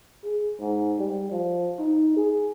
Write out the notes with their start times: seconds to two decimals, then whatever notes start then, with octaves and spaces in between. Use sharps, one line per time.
0.25 G#4
0.60 G#2
0.99 G3
1.31 F3
1.79 D#4
2.17 G#4